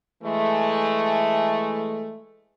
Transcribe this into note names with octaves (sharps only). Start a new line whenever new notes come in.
E3 G#3 A3